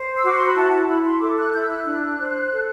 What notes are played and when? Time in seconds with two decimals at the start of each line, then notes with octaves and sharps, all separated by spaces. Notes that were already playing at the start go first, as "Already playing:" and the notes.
Already playing: C5
0.16 E6
0.23 F#4 D6
0.36 C6
0.45 B5
0.55 E4 A5
0.71 A5
0.88 E4 B5
1.04 C6
1.21 A4 D6
1.37 F#6
1.53 E4 G6
1.63 E6
1.69 F#6
1.86 D4 F#6
2.18 C5
2.51 A4